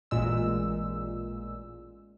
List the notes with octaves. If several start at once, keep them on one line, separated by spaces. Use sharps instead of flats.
A1 A#2 G#3 E6